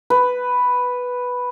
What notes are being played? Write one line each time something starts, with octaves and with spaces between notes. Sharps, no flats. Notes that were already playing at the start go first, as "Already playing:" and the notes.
B4